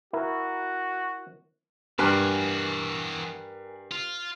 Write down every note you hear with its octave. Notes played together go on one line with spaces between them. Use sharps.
E4 F#4 A#4
G2 E3 F#4 A#4 G#5 F#6
F4